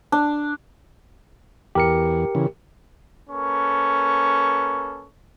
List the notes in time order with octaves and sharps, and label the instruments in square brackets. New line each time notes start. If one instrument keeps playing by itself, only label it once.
[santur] D4
[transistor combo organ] E2 [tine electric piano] G4 A#4 C#7
[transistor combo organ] C#3 E3
[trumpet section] A#3 C#4 A4 B4 C#6